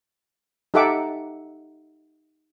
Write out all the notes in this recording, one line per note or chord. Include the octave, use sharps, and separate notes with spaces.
D#4 G4 A4 E5 F#5 D6